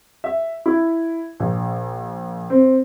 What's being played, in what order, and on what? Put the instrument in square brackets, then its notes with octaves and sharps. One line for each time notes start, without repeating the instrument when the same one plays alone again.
[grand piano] E5
E4
A#1
C4